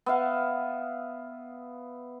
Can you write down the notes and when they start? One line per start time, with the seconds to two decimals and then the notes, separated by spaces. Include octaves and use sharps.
0.06 B3 E5 F5